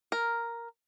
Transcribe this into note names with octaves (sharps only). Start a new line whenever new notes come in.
A#4